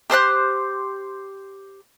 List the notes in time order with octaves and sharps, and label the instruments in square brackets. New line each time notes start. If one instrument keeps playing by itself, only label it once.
[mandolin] G4 C5 C6 F#6